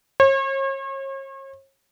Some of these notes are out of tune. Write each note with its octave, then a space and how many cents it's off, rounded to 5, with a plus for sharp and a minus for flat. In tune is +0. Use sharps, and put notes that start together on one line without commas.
C#5 -40